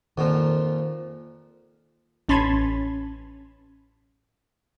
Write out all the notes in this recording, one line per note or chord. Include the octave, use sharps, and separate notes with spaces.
F2 A#2 D#3 F3
A1 C#4 A5 B5 C6 G#6